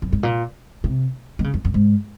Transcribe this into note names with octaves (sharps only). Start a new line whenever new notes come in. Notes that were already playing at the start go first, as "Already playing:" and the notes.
F#2
G#2
A#2
C3
D#3
C#3
F2
F#2
G#2